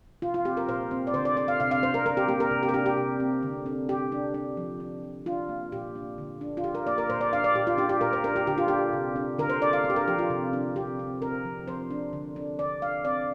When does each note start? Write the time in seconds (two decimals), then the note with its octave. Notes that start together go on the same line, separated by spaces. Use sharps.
0.22 C3 F4
0.34 F4
0.45 C4 G4
0.57 A#4
0.68 A#2 C5
0.91 C4
1.07 D5
1.14 D3 C5
1.25 D5
1.36 D4 D5
1.48 F5
1.60 C3 F5
1.71 F5
1.83 D4 C5
1.94 A#4
2.06 D4 A#4
2.17 G4
2.28 A#3 G4
2.40 A#4
2.51 C3
2.63 G4
2.69 A#4
2.74 D4 G4
2.86 G4
2.98 C3
3.20 C4
3.43 D3
3.66 D4
3.89 C3 G4
4.12 D4
4.34 D4
4.57 F3
4.80 D4
5.04 F3
5.26 D4 F4
5.49 A#3
5.72 A#2 G4
5.95 D4
6.18 D3
6.41 D4
6.57 F4
6.64 D4 G4
6.75 A#4
6.87 A#3 D5
6.98 A#4
7.09 A#2 C5
7.21 D5
7.33 D4 F5
7.44 D5
7.55 A#2 G4
7.67 F4
7.78 D4 G4
7.89 G4
8.01 A#2 A#4
8.13 C5
8.24 D4 A#4
8.36 G4
8.47 D3 G4
8.58 F4
8.68 D4 G4
8.93 C3
9.16 D4
9.38 D3 A#4
9.50 C5
9.61 D4 D5
9.73 F5
9.84 D4
9.90 G4
9.96 A#4
10.07 F3 G4
10.19 F4
10.30 C3
10.53 D4
10.76 C3 G4
10.99 C4
11.22 C4 A#4
11.45 F3
11.68 F3 C5
11.91 D4
12.13 D3
12.36 D4
12.59 D3 D5
12.82 D4 F5
13.05 C4 D5